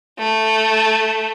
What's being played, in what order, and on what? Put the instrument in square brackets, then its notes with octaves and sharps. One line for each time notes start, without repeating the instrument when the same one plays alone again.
[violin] A3